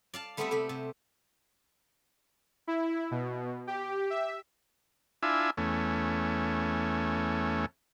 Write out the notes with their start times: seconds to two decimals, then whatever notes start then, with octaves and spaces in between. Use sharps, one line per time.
0.14 D5 F5 A5
0.37 G3 A3 B3 C4 G4 E5
0.51 C3 A3 G4
0.69 C3
2.67 E4
3.11 B2
3.67 G4
4.10 E5
5.23 D4 E4 F4 E5 G#5
5.57 E2 A3 C#4